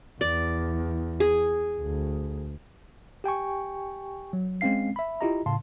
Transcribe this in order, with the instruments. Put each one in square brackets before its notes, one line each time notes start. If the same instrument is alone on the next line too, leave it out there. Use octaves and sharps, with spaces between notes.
[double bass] E2 [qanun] D5
[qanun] G#4
[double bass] D2
[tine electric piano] G4 G5 G#5 C#6
F#3
G#3 C4 C#4 F5 C7
E5 B5
E4 F4 G4 D#5 A#5
A2 C#3 F5 A5 C6